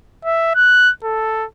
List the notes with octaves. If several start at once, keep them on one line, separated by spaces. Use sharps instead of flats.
E5
F#6
A4